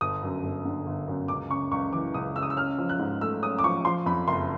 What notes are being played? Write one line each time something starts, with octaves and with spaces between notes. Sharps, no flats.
G1 D#6
F#2
G1
D3
G1
F#2
C#2 D6
C#3 C#6
C#2 C#6
E3 D6
C#2 D#6
C#3 E6
D#6
E6
C#4 F6
F3
F#6
G#2
A3 E6
C#4 D#6
D6
F3 C#6
F3 C6
F2 B5
F#1 C6